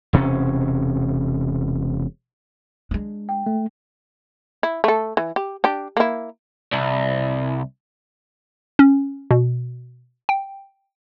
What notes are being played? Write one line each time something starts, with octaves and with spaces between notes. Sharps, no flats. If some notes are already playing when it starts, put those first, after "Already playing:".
E1 C3 C4 C#4
G#3 D4
G5
A3
E4
A3 A4
E3
G4
D4 G4
A#3 E4
C2
C#4
B2
G5